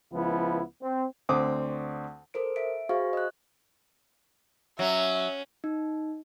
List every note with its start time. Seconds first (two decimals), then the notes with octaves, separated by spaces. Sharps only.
0.13 C#2 F3 B3 E4
0.82 C4
1.29 D2 C4 D6 D#6
2.34 A4 A#4 C5 D7
2.56 E5 B6 D7
2.89 F#4 G#4 C5 F5 C#6
3.13 D#5 F#6
4.79 F#3 C#4 E5
5.64 D#4